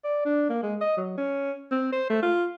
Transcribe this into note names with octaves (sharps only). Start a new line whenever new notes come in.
D5
D4
A#3
G#3
D#5
F#3
C#4
C4
C5
A3
F4